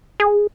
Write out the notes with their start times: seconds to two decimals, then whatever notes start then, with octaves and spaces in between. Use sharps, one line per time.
0.20 G#4